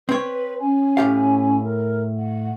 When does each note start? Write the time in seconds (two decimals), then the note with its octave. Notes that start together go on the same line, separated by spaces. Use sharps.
0.09 C4 B4 C#5
0.60 C#4 G#5
0.97 A2 G4 F5
1.63 A#4
2.16 F#5